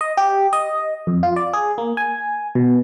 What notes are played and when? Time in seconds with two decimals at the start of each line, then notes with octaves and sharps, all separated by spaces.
0.01 D#5
0.17 G4
0.53 D#5
1.07 F2
1.23 F4
1.36 D5
1.53 G#4
1.78 A#3
1.97 G#5
2.55 B2